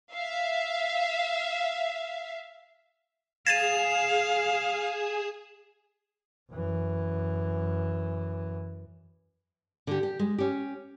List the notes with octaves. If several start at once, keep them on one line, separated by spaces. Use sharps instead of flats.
E5 F5
G#4 F5 G#6 A6 D#7 E7
F#2 E3
D3 G4
G4
G#3
C#4 G4